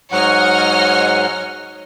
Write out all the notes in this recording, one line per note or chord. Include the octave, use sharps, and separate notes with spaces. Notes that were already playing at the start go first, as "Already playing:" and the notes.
G#2 F#3 C#5 D#5 F#5 F6